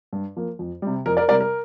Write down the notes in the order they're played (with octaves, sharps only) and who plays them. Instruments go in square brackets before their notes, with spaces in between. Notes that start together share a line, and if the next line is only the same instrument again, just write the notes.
[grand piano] G2
F3 A#3
F2
C3 G3
F2 A#4
A#4 D5
C3 G3 A#4 D5
A#4